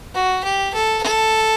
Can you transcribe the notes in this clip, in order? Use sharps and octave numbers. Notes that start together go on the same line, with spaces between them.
F#4
G4
A4
A4